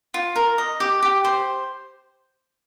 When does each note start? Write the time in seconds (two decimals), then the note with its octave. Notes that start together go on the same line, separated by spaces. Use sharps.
0.14 F4
0.36 A#4
0.58 D#5
0.80 G4
1.03 G4
1.25 C5